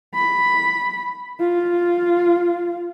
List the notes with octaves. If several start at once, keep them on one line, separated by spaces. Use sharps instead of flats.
B5
F4